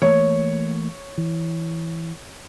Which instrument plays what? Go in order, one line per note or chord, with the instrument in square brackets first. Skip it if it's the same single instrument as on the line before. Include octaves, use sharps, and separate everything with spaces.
[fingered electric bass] E3 A3 A#3 [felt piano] C#5
[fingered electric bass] E3